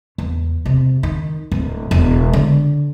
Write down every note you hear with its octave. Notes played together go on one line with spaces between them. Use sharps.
E2
C3
D#3
D1
E1
D3